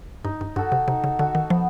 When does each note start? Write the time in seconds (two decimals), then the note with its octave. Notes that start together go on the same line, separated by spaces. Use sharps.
0.24 G2 D#4
0.41 G2
0.56 G2 F#4 A4
0.72 C3
0.88 C3 D#4
1.04 C#3
1.19 D3 F#4 A4
1.35 D#3
1.50 F3 B3